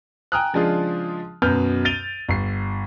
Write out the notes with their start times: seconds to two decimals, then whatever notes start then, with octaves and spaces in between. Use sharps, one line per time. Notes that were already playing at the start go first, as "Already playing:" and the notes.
0.32 G5 G#5 A#5 D#6 F6 F#6
0.53 C#3 F3 G#3 D4 F4 G#4
1.42 F#2 B2 B4 F6 G6
1.85 A6 D7 D#7 F7 G7
2.28 G1 C7